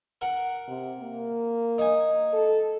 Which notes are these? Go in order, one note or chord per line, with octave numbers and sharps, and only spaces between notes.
A#4 F#5
C3
A#3
D#4 G#5
A4